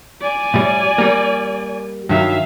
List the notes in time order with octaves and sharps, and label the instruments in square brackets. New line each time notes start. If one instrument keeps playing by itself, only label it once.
[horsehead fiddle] D5 G#5
[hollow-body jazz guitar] A2 G3
G3 A#3
[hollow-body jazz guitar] G2 D#3 F#3 [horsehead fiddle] E5 F5